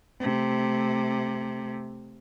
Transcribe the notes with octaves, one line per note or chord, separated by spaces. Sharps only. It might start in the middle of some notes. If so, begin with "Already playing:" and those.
C3 A3